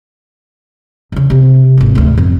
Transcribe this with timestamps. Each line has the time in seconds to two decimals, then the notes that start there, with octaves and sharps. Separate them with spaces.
1.12 E2 C#3
1.30 C3 C4
1.78 G#1 E3
1.95 D2 A3
2.18 F2